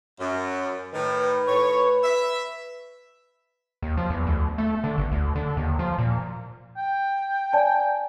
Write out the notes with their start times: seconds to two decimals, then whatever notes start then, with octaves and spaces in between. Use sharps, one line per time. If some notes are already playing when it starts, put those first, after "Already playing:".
0.20 F#2
0.94 A2 D#3 B4
1.48 A2 C#5
2.03 E5
3.82 D#2
3.97 F3
4.10 E2
4.27 D2
4.58 A3
4.84 D3
4.98 G1
5.12 D2
5.36 D3
5.57 D#2
5.79 F3
5.99 A#2
6.77 G5
7.53 D5 G#5 A5